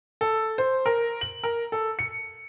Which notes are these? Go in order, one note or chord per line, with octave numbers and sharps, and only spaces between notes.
A4
C5
A#4
F#7
A#4
A4
C#7